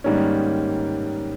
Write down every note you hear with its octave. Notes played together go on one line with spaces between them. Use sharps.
G#2 D#3 G3 A#3 C#4